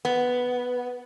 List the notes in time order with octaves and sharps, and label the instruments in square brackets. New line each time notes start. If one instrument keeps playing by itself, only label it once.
[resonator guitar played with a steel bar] B3